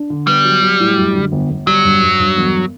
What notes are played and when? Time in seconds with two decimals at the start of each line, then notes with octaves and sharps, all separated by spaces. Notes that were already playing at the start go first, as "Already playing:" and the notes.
Already playing: D4
0.10 D3
0.27 G3 B3
0.45 F#3
0.62 F#3
0.80 A2
0.97 F#2
1.15 D3
1.32 G1
1.50 G1
1.67 F#3 G3
1.85 G2
2.02 G2
2.20 G2
2.37 E1